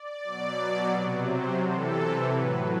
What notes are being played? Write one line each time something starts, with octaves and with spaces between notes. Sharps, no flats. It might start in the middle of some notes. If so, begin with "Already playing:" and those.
Already playing: D5
B2 F#3
C3 F#3
C5
C3 E3 A4
A2 F#3 B4